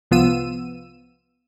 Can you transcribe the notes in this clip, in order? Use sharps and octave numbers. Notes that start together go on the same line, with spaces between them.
C2 F3 B3 F4 E6 D#7